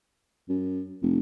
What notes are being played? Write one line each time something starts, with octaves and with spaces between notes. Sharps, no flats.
F#2
F1